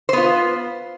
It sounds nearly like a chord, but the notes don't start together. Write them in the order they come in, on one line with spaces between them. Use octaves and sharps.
C5 B3 F4